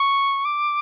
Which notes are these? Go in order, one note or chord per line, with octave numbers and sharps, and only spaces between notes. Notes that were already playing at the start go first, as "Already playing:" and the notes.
Already playing: C#6
D6